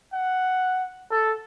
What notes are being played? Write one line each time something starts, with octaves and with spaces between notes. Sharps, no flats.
F#5
A4